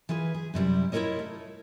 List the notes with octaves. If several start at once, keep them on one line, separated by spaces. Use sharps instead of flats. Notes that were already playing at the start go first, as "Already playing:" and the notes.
E3 F4 G#4 B4
G#4
F#2 C3 G3 E4
E4 F4 A4 A#4 C#5 D#5
A3